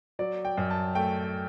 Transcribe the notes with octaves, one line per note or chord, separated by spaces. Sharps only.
F#3 D5
G5
F#2
A5
A3 G5